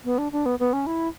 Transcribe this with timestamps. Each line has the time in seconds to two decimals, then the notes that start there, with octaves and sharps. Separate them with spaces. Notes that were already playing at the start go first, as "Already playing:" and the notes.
0.05 B3
0.18 D4
0.32 D4
0.46 B3
0.59 B3
0.73 C#4
0.87 E4